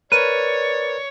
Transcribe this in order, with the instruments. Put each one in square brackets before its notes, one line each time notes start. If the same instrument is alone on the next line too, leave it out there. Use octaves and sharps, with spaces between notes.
[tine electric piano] A#4 B4 [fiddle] C#5 [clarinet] D5 [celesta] D#7